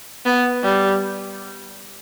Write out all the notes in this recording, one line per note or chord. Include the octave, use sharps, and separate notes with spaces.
B3
G3